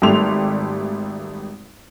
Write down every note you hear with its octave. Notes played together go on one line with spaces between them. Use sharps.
G#1 G3 A3 G4 C6 F7